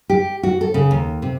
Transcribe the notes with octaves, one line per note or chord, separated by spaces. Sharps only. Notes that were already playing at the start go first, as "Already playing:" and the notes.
G4
F#4
A4
C#3
D#2
C3